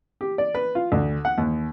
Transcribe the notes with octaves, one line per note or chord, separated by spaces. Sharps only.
G4
D5
B4
F4
D2
F#5
D#2